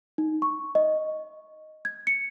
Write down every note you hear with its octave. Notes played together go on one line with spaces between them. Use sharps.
D#4
C#6
D#5
G#6
C#7